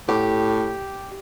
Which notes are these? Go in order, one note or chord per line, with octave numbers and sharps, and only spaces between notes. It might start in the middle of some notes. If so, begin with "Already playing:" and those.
A2 G4